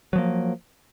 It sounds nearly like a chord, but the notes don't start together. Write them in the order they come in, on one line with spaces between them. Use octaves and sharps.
F#3 F3 A#3